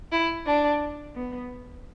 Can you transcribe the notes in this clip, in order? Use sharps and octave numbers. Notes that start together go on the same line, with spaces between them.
E4
D4
B3